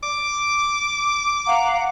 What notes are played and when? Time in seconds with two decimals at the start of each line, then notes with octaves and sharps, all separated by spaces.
0.03 D6
1.46 F5 F#5 A#5